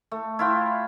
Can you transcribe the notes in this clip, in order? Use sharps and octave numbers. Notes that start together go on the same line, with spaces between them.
A3
E4 F4 G5